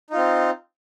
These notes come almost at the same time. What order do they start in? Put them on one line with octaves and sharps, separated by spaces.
D#4 F4 C4